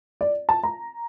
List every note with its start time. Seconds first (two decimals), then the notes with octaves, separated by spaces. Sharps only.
0.21 D5
0.49 A5
0.63 A#5